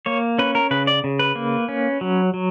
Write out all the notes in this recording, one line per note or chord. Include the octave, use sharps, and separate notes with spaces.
A#3 C#5
C#4 B4
A#4
C#3 B4
D5
C#3
B4
A#3
C#4
F#3
F#3